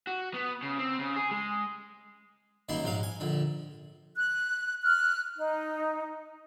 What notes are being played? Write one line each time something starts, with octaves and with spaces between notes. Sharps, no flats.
F#4
B3
C#3
C4
C#3
G#4
G#3
F#2 D#3 G3 A#3 C6
A#1 G#2 F#3 F5
G#5
A#1 D3
F#6
F6 F#6
D#4